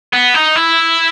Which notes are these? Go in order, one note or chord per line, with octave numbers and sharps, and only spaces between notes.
B3
D#4
E4